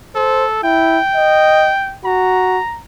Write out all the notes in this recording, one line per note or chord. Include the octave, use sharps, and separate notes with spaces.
A4 C5
E4 G5
D#5
F#4 A#5